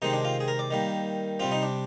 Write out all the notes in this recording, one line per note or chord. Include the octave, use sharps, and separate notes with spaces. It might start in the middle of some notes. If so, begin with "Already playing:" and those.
C3 D#3 G#3 C4 D#4
D4
F4
G#4
A#4
D5
D#3 G3 A#3
C3 G3 C4 F4
D#4
D4